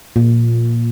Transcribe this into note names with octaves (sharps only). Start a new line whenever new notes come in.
A#2